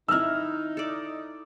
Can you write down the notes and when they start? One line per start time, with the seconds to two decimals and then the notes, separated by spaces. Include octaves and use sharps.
0.08 D#3 D#4 E4 E6 F6
0.77 A4 D5